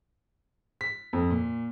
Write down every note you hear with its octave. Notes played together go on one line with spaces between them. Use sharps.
B6
F2
A#2